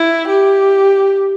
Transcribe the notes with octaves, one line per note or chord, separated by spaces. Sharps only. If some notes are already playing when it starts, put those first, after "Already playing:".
Already playing: E4
G4